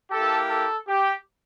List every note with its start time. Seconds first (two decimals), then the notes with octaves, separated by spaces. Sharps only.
0.12 A#3 E4 G4 A4
0.50 A4
0.88 G4